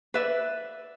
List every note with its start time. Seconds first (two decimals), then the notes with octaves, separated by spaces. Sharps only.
0.14 B4 D5 E5